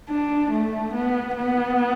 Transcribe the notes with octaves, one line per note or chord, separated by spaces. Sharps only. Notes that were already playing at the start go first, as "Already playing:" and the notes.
D4
A3
B3
B3